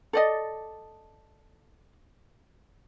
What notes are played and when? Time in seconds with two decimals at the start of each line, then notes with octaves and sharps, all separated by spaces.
0.13 A4 D5 D#5